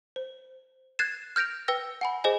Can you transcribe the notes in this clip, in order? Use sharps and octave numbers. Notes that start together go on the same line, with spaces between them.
C5
F#6 G#6 A6 C7 E7
F6 G6 A#6 D7 F7
B4 G5 E6 A#6
F#5 G#5 B5
G#4 C5 D#5 G#5